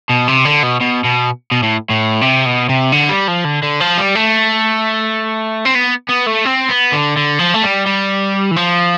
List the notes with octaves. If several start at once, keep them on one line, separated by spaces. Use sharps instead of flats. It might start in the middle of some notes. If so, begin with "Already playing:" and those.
B2
C3
D3
B2
B2
B2
B2
A2
A2
C3
B2
C3
D3
G3
F3
D3
D3
F3
G3
A3
C4
B3
B3
A3
C4
B3
D3
D3
F3
A3
G3
G3
E3
F3